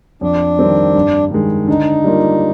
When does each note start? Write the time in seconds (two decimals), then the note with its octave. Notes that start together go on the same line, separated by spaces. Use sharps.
0.21 F2 D4
0.59 D#3 G3 C4
0.95 G2
1.31 D#3 G#3
1.67 D3 D#4
2.04 G3 A#3 F4